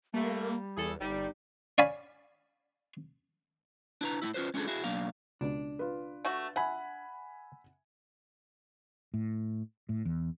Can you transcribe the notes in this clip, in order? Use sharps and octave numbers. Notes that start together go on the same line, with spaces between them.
G3 A3 A#3
E2 G#4 A4
G1 G3 D#4
C#5 D5 F5 G#5 B5
D4 E4 B4 A#5
A2 A3 A#3 E4
C#4 F4 G4 B4 C5
G#3 C#4 D4 F4 G#4 A4
E4 F#4 G#4
B2 F#3 A#3 D4 F5
C#2 B2 D4
F4 B4
A3 F#4
E5 F#5 G#5 B5
A2
A2
E2